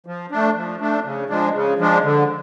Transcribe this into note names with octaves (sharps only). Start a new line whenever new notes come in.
F3
A3 D4
F3
A3 D4
C#3
F3 G#3 D4
C#3
F3 G#3 D4
D3